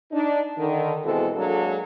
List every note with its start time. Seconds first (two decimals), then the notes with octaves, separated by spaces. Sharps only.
0.12 D4 D#4
0.57 D3 D#3
1.04 B2 E3 G#3 C4 F#4 A4
1.35 F#3 G#3 A#3 D4 A4